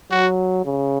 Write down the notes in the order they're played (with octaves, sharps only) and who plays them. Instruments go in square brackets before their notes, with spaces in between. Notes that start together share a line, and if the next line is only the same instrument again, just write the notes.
[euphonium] F#3 [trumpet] F#4
[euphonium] C#3